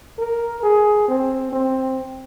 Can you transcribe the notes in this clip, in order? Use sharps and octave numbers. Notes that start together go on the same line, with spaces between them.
A#4
G#4
C4
C4